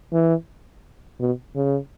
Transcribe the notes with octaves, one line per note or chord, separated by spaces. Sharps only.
E3
B2
C#3